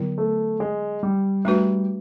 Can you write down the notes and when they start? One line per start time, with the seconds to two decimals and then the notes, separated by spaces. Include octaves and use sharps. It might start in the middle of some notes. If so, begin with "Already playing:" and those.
Already playing: D3 F#3 B3 E4
0.18 A3
0.60 G#3
1.03 G3
1.45 G3 A3 D4 F#4 B4